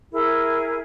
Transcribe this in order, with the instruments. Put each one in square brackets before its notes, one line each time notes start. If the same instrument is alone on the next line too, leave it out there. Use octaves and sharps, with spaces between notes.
[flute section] E4 G#4 A#4